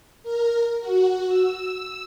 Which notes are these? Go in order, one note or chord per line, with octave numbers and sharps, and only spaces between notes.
A#4
F#4
E6